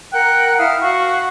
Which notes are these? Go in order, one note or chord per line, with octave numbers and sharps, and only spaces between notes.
A#4 F#5 G5 F#6
E4 F5 D#6 F6
F#4 F5 F#5 C#6